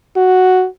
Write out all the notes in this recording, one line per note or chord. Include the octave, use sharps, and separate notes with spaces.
F#4